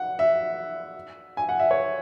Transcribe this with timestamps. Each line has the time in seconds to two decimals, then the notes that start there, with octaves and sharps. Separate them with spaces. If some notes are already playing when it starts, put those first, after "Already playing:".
Already playing: F#5
0.19 E5
1.37 G#5
1.49 F#5
1.59 E5
1.71 C#5